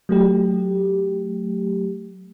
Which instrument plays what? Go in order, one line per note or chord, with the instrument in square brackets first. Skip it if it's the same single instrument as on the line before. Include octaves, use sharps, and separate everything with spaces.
[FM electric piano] F#3 A3 G4